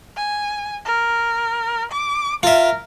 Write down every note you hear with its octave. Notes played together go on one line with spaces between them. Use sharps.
G#5
A#4
D6
F4 A#4 E5